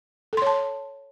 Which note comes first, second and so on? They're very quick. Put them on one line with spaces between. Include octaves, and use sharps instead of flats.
A4 C6 C#5 A5